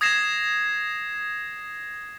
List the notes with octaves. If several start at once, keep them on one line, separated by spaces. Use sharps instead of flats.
D#6 G#6 A#6 C7 E7